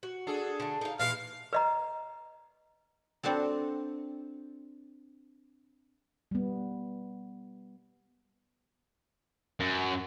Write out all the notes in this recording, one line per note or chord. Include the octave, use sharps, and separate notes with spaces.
F#4
D4 G#4 A4
D3 A3
D#4 F5
A#2 E3 G#3 F5
B4 D#5 A#5
C4 D4 F#4 A4
G3 B3
F#2